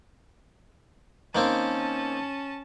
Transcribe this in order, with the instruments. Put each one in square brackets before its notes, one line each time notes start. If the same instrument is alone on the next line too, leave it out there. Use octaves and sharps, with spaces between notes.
[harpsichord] D#3 A#3 C4 [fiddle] C#4 A5